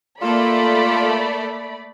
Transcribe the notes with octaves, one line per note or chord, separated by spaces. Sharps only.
A3 A#3 F4 A4 D5 B5